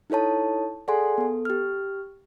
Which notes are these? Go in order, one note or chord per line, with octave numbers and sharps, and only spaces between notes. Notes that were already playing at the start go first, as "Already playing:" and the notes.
D#4 E4 A4 C#5 A5
G#4 A4 D5 F#5 G#5 C6
B3 A4
G4 F6